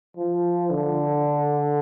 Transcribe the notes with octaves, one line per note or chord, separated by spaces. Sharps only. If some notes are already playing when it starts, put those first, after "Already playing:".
F3
D3